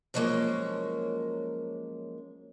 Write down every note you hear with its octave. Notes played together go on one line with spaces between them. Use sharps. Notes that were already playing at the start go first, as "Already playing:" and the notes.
F3 F#3 G#3 A#3 C#4